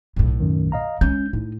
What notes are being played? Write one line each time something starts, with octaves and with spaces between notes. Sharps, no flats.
B1 A2
F#2 D#3
D#5 F5 A#5
G#3 C#4 G6
A2 D#4